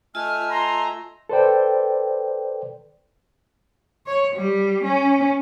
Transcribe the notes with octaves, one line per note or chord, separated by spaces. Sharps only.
A3 F4 D#5 G#5 E6 F6
A#5 C6
A4 B4 C5 D5 G5
C#5
G3
C#4